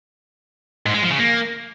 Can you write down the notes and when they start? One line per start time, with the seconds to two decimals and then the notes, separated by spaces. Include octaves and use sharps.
0.86 G#2
0.94 G#3
1.02 F3
1.10 C#3
1.19 A#3